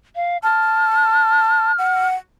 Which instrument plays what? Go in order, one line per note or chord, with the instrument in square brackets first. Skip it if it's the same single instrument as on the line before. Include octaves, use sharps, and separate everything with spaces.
[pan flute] F5
[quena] A5 [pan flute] F6
[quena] F#5